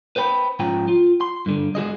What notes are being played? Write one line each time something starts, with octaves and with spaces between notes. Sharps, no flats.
B4 C5 G5 B5
G#2 F3 C#4 G5 A#5
F4
C6
G2 D3
G#3 F#4 G#4 D#5